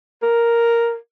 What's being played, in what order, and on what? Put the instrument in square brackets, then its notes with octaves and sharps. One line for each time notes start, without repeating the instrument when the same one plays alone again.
[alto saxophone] A#4